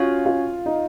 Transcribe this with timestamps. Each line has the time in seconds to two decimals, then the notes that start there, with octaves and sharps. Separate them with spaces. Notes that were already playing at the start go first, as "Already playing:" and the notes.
Already playing: C#4 F4 F#4 C#5
0.26 F4
0.66 D#4